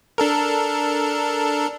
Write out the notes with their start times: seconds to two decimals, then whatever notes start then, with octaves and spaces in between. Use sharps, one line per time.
0.18 D4 A4 A#4